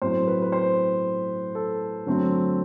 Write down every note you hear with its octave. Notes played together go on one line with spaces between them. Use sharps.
A2 F#3 A3 C4 C5
B4
B4
C5
A4
D3 F#3 A3 C4